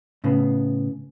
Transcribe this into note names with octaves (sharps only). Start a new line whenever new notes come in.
A2 C#3 B3